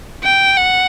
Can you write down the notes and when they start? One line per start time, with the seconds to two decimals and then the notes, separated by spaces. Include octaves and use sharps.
0.24 G5
0.57 F#5